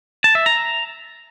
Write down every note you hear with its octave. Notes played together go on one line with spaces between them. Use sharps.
A5
E5
A#5